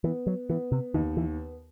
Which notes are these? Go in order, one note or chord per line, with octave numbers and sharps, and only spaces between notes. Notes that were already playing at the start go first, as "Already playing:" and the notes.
E3 B3
F#3
E3 B3
C3
D#2 D#3
E3